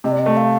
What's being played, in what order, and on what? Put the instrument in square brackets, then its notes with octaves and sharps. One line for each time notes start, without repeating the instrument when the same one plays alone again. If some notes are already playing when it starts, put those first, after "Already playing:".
[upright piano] C3 [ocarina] D#5
[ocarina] D5
D#5
[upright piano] A3
[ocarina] F5